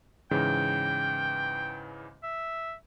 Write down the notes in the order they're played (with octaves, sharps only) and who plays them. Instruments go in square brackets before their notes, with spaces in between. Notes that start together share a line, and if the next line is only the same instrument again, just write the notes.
[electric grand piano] G#2 C#3 E3 [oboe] G5
[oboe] E5